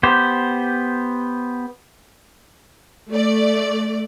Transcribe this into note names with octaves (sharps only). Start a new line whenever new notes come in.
B3 G4 C5
A3 D5